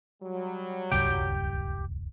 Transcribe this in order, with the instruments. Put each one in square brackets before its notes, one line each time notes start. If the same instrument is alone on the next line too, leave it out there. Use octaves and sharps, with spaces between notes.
[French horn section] F#3 G3
[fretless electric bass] D1 C2 F#2 [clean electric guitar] G4 G5